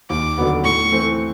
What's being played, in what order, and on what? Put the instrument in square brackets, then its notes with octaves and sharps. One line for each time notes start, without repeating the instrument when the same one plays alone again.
[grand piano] D#2 [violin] D6
[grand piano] D3 F#3 B3
[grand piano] A2 [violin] C#6
[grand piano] E3 A3 C4